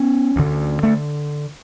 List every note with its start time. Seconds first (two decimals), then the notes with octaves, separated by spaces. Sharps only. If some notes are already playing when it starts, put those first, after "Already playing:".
Already playing: B3 C#4
0.36 D2 D3
0.83 A3